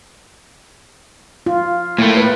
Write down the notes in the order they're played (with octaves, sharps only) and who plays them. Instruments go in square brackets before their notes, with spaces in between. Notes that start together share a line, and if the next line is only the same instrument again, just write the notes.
[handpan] F4
[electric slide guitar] A2 A3 [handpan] A#3
[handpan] B4